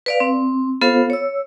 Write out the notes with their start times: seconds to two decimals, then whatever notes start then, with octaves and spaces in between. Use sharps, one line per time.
0.06 B4 D5 F5
0.20 C4
0.81 B3 F4 A4 C5 F5
1.10 C#5 E6